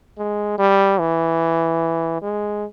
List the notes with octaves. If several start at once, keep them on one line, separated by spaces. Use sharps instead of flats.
G#3
G3
E3
G#3